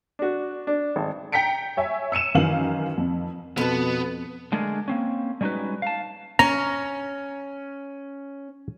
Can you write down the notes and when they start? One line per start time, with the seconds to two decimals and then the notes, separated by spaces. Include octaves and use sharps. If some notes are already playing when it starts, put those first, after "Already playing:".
0.19 D4 F#4
0.67 D4
0.96 G#1
1.32 G5 A#5 B6 C#7 D7
1.77 C#5 E5 G#5
2.12 E6 C#7 D#7 E7
2.35 F#2 D#3 E3 F5 F#7
2.98 F2
3.57 F2 B2 B3 A5
4.52 D3 G#3 A3 D4 G#4 A#4
4.88 A#3 C4 C#4
5.41 G3 G#3 C#4 D#4 F#4 B4
5.82 F5 A5
6.39 C#4 A#5